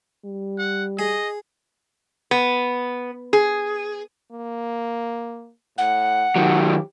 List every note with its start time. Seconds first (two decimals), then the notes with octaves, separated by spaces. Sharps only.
0.25 G3
0.58 F#5
0.99 G#4 D#5
2.31 B3
3.33 G#4
4.32 A#3
5.78 A2 F#5
6.36 D#3 F#3 G4